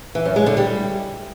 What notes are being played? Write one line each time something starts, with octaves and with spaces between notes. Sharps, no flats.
E3
F#2
G#3
D3
G3